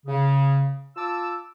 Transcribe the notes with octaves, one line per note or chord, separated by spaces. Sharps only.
C#3
F4 A5 D6 E6